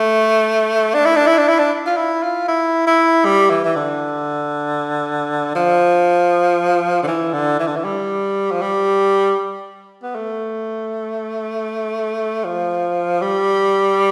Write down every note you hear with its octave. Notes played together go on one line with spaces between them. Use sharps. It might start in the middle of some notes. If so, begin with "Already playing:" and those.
Already playing: A3
D4
E4
D4
E4
D4
E4
D4
F4
E4
F4
E4
E4
G3
E3
E3
D3
F3
D3
E3
D3
E3
D3
E3
G3
F3
G3
B3
A3
F3
G3